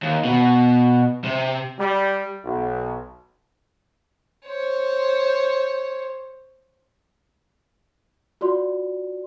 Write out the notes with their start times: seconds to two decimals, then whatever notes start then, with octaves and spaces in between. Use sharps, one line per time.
0.03 D#2
0.25 B2
1.24 C3
1.79 G3
2.45 B1
4.45 C5 C#5
8.41 F4 F#4 D5 C6